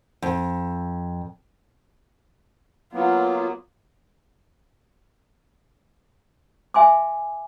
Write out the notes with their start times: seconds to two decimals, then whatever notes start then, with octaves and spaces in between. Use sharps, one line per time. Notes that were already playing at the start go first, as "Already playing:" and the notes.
0.22 F2
2.93 F#3 A#3 B3 F4
6.74 E5 G#5 C6 D6